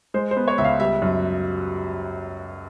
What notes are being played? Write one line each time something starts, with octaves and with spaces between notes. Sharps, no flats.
G#3 C5
C5
B3
C#5
C#2 E5
F5
G3 E5
F#2